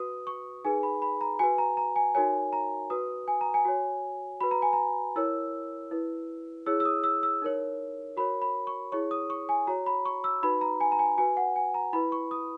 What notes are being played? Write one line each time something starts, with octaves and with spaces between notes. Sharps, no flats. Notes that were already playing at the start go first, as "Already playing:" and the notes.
Already playing: F#4 B4 D#6
C#6
D#4 G#4 B4 G#5
B5
B5
A#5
F#4 B4 G#5
A#5
A#5
G#5
D#4 F#4 A#4 C#5 G#5
A#5
F#4 B4 D#6
G#5
A#5
G#5
F#4 C#5
F#4 B4 B5
A#5
G#5
A#5
E4 A#4 C#5 E6
E4 B4
E4 G#4 C#5 E6
E6
D#6
E6
E6
D#4 A#4 C#5
F#4 A#4 C#5 B5
B5
C#6
E4 G#4 C#5 C#6
D#6
C#6
G#5
F#4 C#5 A#5
B5
C#6
E6
D#4 F#4 B4 B5
A#5
G#5
A#5
G#5
F#4 B4 G#5
F#5
G#5
A#5
E4 B4 B5
C#6
D#6